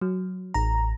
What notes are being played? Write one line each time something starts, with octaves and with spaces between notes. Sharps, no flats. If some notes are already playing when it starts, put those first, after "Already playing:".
F#3
A1 A#5